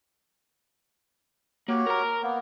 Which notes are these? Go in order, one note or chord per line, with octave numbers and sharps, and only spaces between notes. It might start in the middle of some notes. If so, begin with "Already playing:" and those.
A#3 F#4 G4 C#5
A#4 A#5
A#3 B3